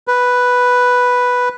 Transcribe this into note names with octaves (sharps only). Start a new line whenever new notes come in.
B4